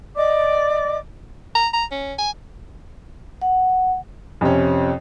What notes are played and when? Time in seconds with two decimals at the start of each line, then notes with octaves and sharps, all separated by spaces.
0.15 D5 D#5 D6
1.55 A#5
1.73 A#5
1.91 C#4
2.19 G#5
3.42 F#5
4.41 F2 C3 C#4